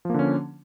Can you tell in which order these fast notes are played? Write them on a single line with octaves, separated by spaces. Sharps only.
F3 A#3 D3 C#4